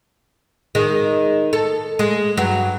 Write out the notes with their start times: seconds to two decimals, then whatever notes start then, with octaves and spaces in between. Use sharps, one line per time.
0.75 D#3 G#3
1.53 A4
1.99 G#3
2.37 G2 F#3